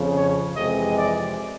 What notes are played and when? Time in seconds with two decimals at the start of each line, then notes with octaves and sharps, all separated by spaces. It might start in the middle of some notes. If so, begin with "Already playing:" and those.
Already playing: F2 C#3 F3
0.14 C#5
0.54 F2 C3 E3 G#3 D#5
0.96 D5